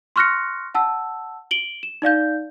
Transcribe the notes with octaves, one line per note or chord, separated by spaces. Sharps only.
C6 C#6 F6 F#6 A#6 C#7
F#5 A5 E6
D7 F#7 G7
E7
D#4 D5 F5 G6